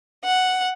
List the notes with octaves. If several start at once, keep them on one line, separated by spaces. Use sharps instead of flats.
F#5